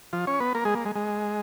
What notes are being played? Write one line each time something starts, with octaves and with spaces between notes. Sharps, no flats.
F3 F4
C#4 C#5
B3 B4
A#3 A#4
G#3 G#4
A#3
G#3
G#3